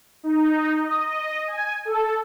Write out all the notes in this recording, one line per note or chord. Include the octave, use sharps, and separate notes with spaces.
D#4
D#5
G#5
A4